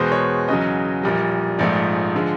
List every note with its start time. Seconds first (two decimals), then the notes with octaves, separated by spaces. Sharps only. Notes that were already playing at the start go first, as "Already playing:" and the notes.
Already playing: E2 B2 G#3 C5
0.12 C#5
0.48 E2 C#3 F#3 D#5
1.03 A#1 A#2 G3
1.59 A#1 G#2 F3 A3 D5
2.15 D3 F3 G#3